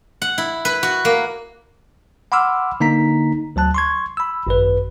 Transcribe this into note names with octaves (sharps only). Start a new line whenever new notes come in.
F#5
E4
B4
F#4
A#3
F#5 B5 C6 D6 E6 F6
D3 A#3 D#4 A#5 B6
D2 F#3 A5 F#6
C6 C#6 G#6
B5 E6
G#1 F#2 B4